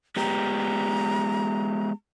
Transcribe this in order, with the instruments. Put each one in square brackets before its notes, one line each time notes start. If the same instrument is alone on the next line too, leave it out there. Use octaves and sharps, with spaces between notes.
[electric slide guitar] G#3 B3 G4 [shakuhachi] A#5